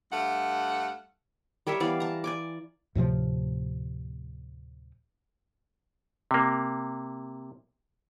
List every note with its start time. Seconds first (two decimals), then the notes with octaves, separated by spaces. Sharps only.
0.11 G2 A3 F5 F#5
1.67 G3 A#4 C#5 E5
1.80 E3 B3 D5 F5
2.00 A5 A#5
2.24 D5 G#5 D6
2.95 D2 A2 C3 F3
6.31 C3 A#3